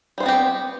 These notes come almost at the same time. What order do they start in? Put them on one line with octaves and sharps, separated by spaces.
G3 C5 B3 C4 G4